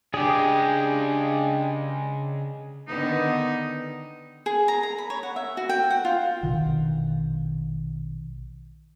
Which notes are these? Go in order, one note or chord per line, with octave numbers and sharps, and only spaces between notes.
C#3 G#3 D4 G4 G#4
D3 D#3 B3 D#4
G#4
A#5
A#5
B5
C#5
F#5
E5
F#4
G5
F#5
F4
A#1 B2 D#3